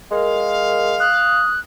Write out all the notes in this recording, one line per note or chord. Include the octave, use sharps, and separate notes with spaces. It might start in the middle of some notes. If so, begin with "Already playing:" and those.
G#3 A#4 F5
D#6 F#6